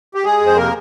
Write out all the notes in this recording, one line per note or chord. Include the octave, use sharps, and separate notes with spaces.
G4
G#3 G#4
F2
C5
C3 A#3 A#4